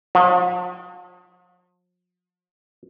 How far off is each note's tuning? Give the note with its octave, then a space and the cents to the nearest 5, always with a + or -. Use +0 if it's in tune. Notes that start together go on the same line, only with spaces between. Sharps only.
F3 +45